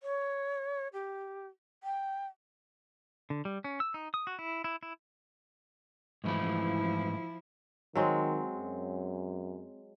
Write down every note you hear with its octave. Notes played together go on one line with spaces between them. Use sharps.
C#5
G4
G5
D3
G3
C#4
E6
D#4
D#6
F#4
E4
E4
E4
G#2 E3 F3 A3 E4
D#3 F#3 G#3 C4
F#2